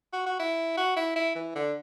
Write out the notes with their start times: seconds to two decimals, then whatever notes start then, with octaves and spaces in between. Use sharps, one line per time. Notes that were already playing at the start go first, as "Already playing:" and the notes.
0.13 F#4
0.26 F#4
0.39 E4
0.77 F#4
0.96 E4
1.16 E4
1.35 E3
1.55 D3